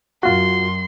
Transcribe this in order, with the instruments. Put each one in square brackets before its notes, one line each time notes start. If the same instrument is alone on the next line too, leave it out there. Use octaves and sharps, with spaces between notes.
[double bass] F#2 [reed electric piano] F4 F#4 [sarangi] C6